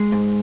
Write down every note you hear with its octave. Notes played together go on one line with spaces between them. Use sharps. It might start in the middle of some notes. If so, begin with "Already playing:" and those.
Already playing: G#3
G#2